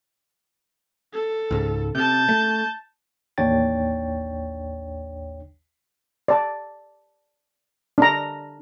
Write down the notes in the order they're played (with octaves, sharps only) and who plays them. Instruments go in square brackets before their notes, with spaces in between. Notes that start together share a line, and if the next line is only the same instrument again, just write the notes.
[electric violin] A4
[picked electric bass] C#2 G#2
[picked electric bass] C3 [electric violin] A5 G6
[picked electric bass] A3
[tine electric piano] A1 D#2 D4 C#5 G5 A6
[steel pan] D5 A5
D4 A#5